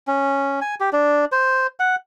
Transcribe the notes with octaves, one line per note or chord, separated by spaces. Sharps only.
C#4
G#5
G4
D4
C5
F#5